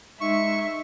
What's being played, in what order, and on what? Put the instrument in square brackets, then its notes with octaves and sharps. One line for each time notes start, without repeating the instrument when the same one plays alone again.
[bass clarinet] G#3 [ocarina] D#4 [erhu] E5 [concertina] C#6